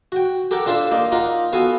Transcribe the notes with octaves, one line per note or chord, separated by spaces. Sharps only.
F#4 G5
G4 A4 A#4 F#5 G5
D4 F4 A4 C5 E5
A#3 D#4 D5
D#4 F4 A#4 F#5
B3 F#4 A4 F5 G#5